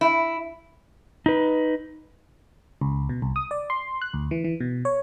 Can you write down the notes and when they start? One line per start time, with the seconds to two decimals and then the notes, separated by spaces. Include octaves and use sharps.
0.01 E4
1.26 D#4 B4
2.81 C#2
3.09 B2
3.22 C2
3.36 D#6
3.51 D5
3.70 C6
4.02 F#6
4.14 D2
4.31 E3
4.44 E3
4.60 B2
4.85 C#5